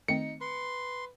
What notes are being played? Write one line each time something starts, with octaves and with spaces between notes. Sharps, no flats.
D#3 A3 C4 D#4 C#7
B4 C6